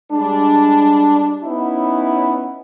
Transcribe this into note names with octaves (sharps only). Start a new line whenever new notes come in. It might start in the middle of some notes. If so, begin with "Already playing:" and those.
G3 G#3 D4
B3 C#4 D#4 E4 C#5